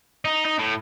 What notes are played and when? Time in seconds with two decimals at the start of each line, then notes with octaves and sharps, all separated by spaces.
0.25 D#4
0.45 D#4
0.59 A2